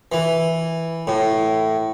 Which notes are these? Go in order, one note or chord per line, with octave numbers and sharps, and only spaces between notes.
E3
A2